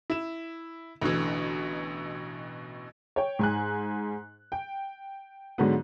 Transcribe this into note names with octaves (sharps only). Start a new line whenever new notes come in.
E4 E7
A1 B2 D3 E3
C#5 G5
G#2 G#5 F#6
G5
G#2 D3 F#3 G#3 B3